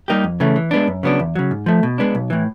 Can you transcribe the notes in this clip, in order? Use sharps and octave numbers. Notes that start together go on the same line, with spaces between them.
G3 A#3 D#4 G4
F2
C#3 E3 A3
E3
G#3 B3 D4
F#2
C#3 F#3 B3 D4
E2
C#3 F#3
G#2
F3 A3
B2
G#3 B3 D4
B1
A2 E3